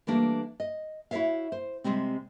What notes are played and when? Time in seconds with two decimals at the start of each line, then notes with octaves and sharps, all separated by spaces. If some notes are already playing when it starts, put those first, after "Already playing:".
0.07 E3 G3 A3 A#3 D4
0.60 D#5
1.11 E4 F#4 A#4 C#5 E5 F5
1.52 C5
1.84 C3 D#3 G3 G#3 C4